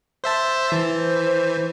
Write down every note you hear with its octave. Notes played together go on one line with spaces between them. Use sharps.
C5 E5 A5
E3 C5